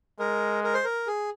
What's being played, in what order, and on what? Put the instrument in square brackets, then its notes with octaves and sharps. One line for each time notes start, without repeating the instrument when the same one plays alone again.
[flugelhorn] G#3 [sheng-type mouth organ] A#4
[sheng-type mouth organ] A#4
C5
A#4
G#4